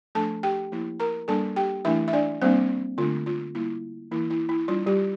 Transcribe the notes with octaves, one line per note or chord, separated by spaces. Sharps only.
F3 A3 D4 A4 A5
G4 G5
F3 A#3 E4
A#4 A#5
G3 A#3 D4 A4 A5
G4 G5
E3 A3 D4 E4 E5
E5
D4 D5
G3 A#3 C4 D4 C5
D3 A3 D4 F4
F4
G3 A#3 E4
E3 A#3 E4
E4
E4
G3 D4 F4
G3 G4